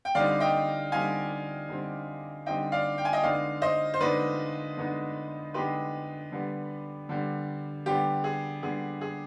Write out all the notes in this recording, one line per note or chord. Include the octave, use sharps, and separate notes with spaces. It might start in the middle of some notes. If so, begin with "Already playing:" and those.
G5
D3 G3 C4 D#4 D5 F5
D#5 G5
D3 G3 C4 D#4 F5 G#5
D3 G3 C4 D#4
D3 G3 C4 D#4 D#5 G5
D5 F5
G5
G#5
D#5 G5
D3 G#3 B3 D#4 D5 F5
C5 D#5
C5
D3 G#3 B3 D#4 B4 D5
D3 G#3 B3 D#4
D3 G#3 B3 D#4 G4 B4
D3 G3 B3
D3 G3 B3
D3 G3 B3 G4
G#4
D3 G3 B3 G#4
G#4